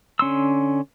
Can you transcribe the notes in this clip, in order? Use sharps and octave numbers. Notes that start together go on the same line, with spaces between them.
D3 C#4 C6 E6